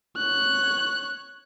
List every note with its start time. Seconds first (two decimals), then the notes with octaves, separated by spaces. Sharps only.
0.17 C#5 F#6